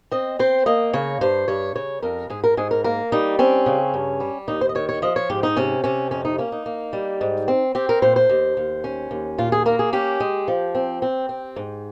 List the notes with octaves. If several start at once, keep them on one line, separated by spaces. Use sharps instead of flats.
C4 D#5
C4 C5
A#3 D#5
C#3 C#5
G2 C5
G2 C#5
C#3 C#5
F2 A#4
G#2 G#4
A#4
G#2 G#4
A#4
A#3 A#4
G3 D#4
C4 C#4
C#3
G2
G3
D#2 D#4
C5
D#5
D#3 C#5
C#5
F3 D#5
C#5
G#2 G4
D#4
C3 C#4
C3 C#4
F2 C#4
D#4
A#3 C#4
D#4
A#3
G3
G#2
C4
C4 G4
A#4
A#2 C5
C5
D#2
D#2
C#4
D#2
A#2 F4
G#4
A#3 A#4
G#4
C#4 G4
G#3
F3
C4
C4
C4
G#2